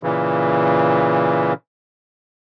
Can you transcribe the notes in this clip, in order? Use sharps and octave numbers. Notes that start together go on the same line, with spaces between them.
A#2 C#3 E3